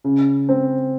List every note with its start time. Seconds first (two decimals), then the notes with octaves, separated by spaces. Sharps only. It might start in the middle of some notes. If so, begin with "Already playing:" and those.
0.04 C#3
0.49 C4